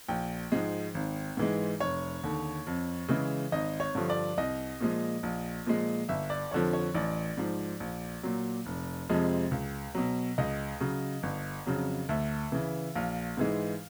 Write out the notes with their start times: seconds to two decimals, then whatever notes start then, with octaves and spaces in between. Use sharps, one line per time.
0.08 A#1 G5
0.52 G#2 F3 G#3
0.95 G#1
1.37 G#2 E3 G#3
1.80 F1 C#5
2.23 D#2 D3
2.67 F2
3.08 C#3 E3 G#3
3.52 G#1 D#5
3.80 C#5
3.95 G2 D3 F3
4.10 D5
4.38 C2 D#5
4.80 A#2 F3 G#3
5.23 A#1
5.66 A#2 F3 G#3
6.09 G1 E5
6.30 D5
6.51 F2 D3 F3 C#5
6.73 C#5
6.94 A1 D5
7.37 G#2 F3
7.80 A#1
8.23 A#2 F#3
8.66 F1
9.09 F2 C3 F3 G#3
9.51 C#2
9.95 B2 F#3
10.38 C#2 D#5
10.80 C#3 F#3
11.23 G1
11.66 F2 C#3 F#3
12.09 D2 E5
12.52 C#3 E3
12.95 A#1 F5
13.37 G#2 E3 G#3